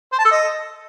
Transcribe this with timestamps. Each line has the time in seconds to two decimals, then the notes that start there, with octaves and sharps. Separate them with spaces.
0.13 C5
0.19 A5
0.25 A4
0.31 D#5